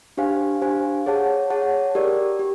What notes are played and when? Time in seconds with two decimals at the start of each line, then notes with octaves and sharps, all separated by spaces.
0.17 D4 G4 C5 F5 G#5
0.62 D4 G4 C5 F5 G#5
1.06 G#4 C#5 F#5 A5
1.50 G#4 C#5 F#5 A5
1.95 G4 A#4 D5
2.39 G4